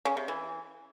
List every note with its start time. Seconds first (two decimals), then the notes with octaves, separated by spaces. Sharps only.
0.05 C#3
0.17 C3
0.28 E3